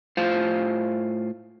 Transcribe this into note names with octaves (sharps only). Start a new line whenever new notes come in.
A2 F4 C5 F5